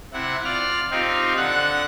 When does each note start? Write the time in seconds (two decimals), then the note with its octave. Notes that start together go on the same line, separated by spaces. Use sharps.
0.13 C3 E4 F#5
0.44 F4 D5 F6
0.91 C4 D#4 F4 G4
1.37 D3 F#5 F#6